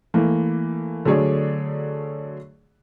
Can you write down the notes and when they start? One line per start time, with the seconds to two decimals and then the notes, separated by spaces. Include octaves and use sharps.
0.14 E3 A3 A#3
1.05 D3 F#3 A3 G#4 C#5 D5